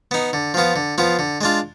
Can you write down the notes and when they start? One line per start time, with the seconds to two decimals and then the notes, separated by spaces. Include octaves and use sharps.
0.11 B3 D#4
0.33 D3
0.54 F3 B3 F4
0.76 D3
0.98 F3 B3 F4
1.19 D3
1.41 G#3 D4 F4